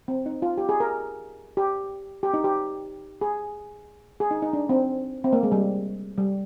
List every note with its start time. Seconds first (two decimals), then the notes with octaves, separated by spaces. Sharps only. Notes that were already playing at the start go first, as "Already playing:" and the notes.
0.08 C4
0.26 D#4
0.42 F4
0.58 G4
0.69 G#4
0.80 A#4
1.57 G4
2.23 G4
2.34 D#4
2.44 G4
3.21 G#4
4.20 G#4
4.31 D#4
4.42 D#4
4.53 D4
4.69 C4
5.24 C4
5.33 A#3
5.43 G#3
5.52 G3
6.18 G3